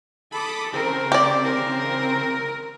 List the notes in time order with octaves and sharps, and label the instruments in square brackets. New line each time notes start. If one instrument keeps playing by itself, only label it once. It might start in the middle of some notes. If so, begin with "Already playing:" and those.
[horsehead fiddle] A4 [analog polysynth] B5 D6 D#6
[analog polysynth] C#3 C4 [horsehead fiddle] A#4
[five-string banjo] G4 D5
[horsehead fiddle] A#4 A#5